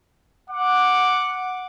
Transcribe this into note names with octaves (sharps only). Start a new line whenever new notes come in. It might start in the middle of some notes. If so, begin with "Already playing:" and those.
F#5 D6